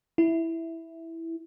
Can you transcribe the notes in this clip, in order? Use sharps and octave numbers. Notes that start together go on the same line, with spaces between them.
E4